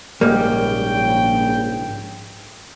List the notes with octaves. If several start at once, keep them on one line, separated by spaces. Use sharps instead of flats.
A#1 G#2 C#3 G3 A#3 G5